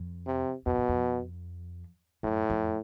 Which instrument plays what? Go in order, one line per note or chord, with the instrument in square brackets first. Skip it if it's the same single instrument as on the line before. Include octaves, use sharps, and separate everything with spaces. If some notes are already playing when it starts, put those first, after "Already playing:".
Already playing: [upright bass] F2
[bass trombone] C3
[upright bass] F2 [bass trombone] B2
[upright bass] F#2
F2
[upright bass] F#2 [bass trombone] A2
[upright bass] F2